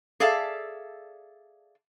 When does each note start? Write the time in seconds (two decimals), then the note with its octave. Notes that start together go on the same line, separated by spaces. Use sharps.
0.20 G#4 A4 D5 E5 F5 A5